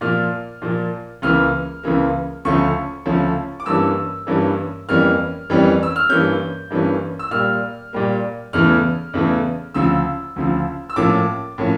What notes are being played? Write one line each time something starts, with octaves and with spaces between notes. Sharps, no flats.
A#2 F3 A#3 F6
A#2 F3 A#3
C#2 C#3 E3 A#3 F6
C#2 C#3 E3 A#3
D2 C#3 F3 A3 C#4 C#6
D2 C#3 F3 A3 C#4
D6
G2 E3 A#3 C#4 E6
G2 E3 A#3 C#4
F2 E3 G3 A#3 C#4 F6
F2 E3 G3 A#3 C#4
E6
F6
G2 E3 A#3 C#4 G6
G2 E3 A#3 C#4
E6
A#2 G3 A#3 F6
A#2 G3 A#3
E2 C#3 E3 A3 F6
E2 C#3 E3 A3
D2 C#3 F3 E6
D2 C#3 F3
E6
A2 F3 A#3 C#4 D6
A2 F3 A#3 C#4